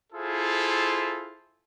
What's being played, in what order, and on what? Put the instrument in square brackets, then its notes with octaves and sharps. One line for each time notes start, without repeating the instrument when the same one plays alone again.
[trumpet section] E4 F4 G#4 A4 C5